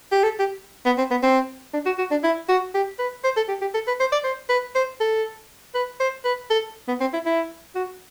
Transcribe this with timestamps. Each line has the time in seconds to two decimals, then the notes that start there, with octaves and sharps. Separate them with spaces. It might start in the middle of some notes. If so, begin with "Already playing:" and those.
0.12 G4
0.23 A4
0.39 G4
0.86 B3
0.98 C4
1.11 B3
1.23 C4
1.74 D4
1.86 F#4
1.99 F#4
2.11 D4
2.24 E4
2.49 F#4
2.74 G4
2.99 B4
3.24 C5
3.37 A4
3.49 G4
3.62 G4
3.74 A4
3.88 B4
4.00 C5
4.12 D5
4.24 C5
4.50 B4
4.75 C5
5.01 A4
5.75 B4
6.00 C5
6.25 B4
6.51 A4
6.88 B3
7.01 C4
7.14 E4
7.26 E4
7.75 F#4